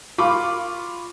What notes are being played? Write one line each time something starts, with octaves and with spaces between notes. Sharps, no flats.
F4 B5 C#6 D6